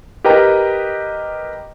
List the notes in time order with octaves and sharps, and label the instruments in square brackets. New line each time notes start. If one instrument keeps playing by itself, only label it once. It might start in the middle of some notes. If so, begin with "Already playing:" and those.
[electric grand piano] G4 A#4 B4 D#5 G5 A#5